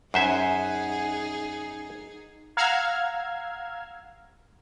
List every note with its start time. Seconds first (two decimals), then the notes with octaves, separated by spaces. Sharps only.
0.14 F#2 D#4 G#4 C5 E5 F#5 G#5
2.57 F5 F#5 A#5 E6 F6 G#6